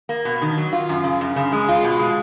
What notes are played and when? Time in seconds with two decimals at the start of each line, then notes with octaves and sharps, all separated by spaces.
0.09 A#3
0.25 B2
0.42 D#3
0.57 F#3
0.73 F4
0.89 F#2
1.04 C#3
1.21 F#2
1.36 C#3
1.52 G#3
1.68 F4
1.84 B2
1.99 G#3